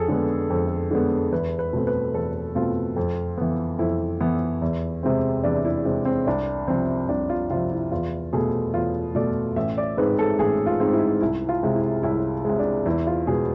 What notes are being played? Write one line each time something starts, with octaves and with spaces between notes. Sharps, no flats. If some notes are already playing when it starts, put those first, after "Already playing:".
Already playing: F2 G#4 A4
D3 G#3 B3
F2
D3 G#3 B3
E2 B4
B4
B2 A3 C4
B4
E2 A4
B2 A3 C4 F4
F2
E3 B3
F2 E4
E3 B3
E2
C3 G#3 C4
E2 D4
E4
C3 G#3 C4 D4
C4
C2 D4
C3 F3 C4
C2 D4
F4
C3 F3 F4
E4
E2 F4
B2 A3 G#4
E2 F4
B2 A3 D5
A1 E5
D5
G#2 G#3 C4 B4
A4
A1 G#4
F4
G#2 G#3 C4
E4
C2 E4
F4
C3 G#3
E4
C2 E4
C3 G#3
D4
E2 E4
F4
B2 G#3 B3 G#4